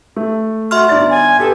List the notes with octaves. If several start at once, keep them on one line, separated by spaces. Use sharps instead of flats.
A3
F#4 E5 C6 F6
G1 D#4 D5 A6
G#5
B3 G4 A4